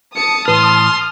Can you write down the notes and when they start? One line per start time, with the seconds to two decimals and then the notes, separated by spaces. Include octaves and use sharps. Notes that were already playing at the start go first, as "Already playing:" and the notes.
0.16 A5 D#6 C#7
0.48 A2 E3 B4 C6 F6